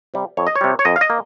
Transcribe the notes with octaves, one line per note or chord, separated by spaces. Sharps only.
C3 G3
F2 C#5
D#5
C#5
C3 G3
C#5
F2 D#5
F5
D#5
A#3